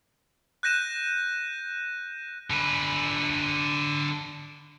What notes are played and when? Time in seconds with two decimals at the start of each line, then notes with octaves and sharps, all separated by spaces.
0.63 F#6 G6 A#6 D#7 E7
2.50 D3 B4